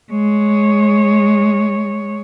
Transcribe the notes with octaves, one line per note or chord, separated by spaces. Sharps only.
G#3 C#5